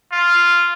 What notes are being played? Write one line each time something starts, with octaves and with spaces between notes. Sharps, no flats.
F4